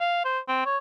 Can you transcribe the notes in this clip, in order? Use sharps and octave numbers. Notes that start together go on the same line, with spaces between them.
F5
C5
C4
C#5